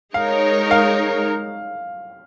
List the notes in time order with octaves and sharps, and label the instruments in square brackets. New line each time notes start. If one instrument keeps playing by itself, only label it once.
[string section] G#3 D#4 A#4 C#5 [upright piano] F5
[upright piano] F5